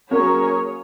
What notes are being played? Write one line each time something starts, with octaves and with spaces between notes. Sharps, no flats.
F#3 A#3 C#4 G#4 A#4 C#5